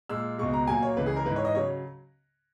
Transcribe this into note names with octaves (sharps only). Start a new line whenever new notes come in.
A#2 G#3 E6
C#2 B2 G#3 C#6
A#5
A#2 F#3 A#3 G#5
C#5
C#2 C#3 E3 B4
G#4
A#4
G#2 E3 G#3 B4
C#5
D#5
C#3 F#3 C#5